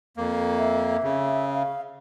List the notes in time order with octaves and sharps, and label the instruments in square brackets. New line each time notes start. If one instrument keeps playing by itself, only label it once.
[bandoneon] F2 A#3
[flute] E5
[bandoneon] C#3
[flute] F5